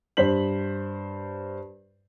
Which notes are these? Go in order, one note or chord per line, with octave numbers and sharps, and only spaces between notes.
G2 C5 B6 F#7